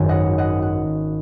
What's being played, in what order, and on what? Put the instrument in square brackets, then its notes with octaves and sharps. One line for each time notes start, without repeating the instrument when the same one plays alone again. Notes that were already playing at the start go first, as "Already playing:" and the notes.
Already playing: [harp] G#1 F#2 D#3 F#3 G#5
D#5 F#5
D#5 F#5
F#5